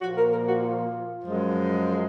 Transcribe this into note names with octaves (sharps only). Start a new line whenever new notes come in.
A#2 F3 A#3 F#4
A#4
A#4
F#4
F4
F#2 F3 G#3